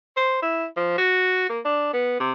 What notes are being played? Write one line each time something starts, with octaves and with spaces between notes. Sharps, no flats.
C5
E4
F3
F#4
A#3
D4
B3
C3